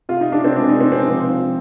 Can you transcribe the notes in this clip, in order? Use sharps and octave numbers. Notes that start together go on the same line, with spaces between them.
C3 F4
D#4
C3 D4
C4
G#3 D4
D#4
G#3 C4
C4
F3
F3